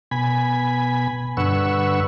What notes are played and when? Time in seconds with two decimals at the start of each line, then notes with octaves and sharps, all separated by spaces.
0.11 B2 G#5 B5
1.37 G2 D3 B4 F#5 C#6 E6